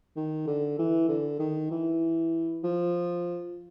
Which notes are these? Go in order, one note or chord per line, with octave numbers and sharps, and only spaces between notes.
D#3
D3
E3
D3
D#3
E3
F3